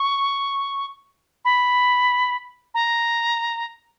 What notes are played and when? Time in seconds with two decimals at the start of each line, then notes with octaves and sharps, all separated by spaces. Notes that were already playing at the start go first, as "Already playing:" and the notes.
Already playing: C#6
1.45 B5
2.74 A#5